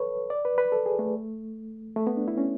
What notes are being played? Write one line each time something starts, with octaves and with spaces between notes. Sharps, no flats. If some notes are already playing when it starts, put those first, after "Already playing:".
Already playing: A4 B4 C#5
D5
B4
B4
A4
G#4
A3
A3
B3
D4
E4
C#4